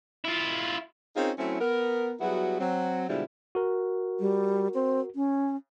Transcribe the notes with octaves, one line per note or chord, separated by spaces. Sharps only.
E4 F4
C4 C#4 D#4 F4 G#4 A#4
F#3 A3 C4 C#4 E4
B3 A#4
F#3 G3 B3 E4 F#4 G#4
F#3 C4
B2 D3 F3 G3 G#3 E4
F#4 A#4
G3
C4
C#4